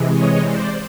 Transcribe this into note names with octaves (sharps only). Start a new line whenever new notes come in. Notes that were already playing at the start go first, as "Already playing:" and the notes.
Already playing: C3 E3 G#3
C#5 D#5
C5 D5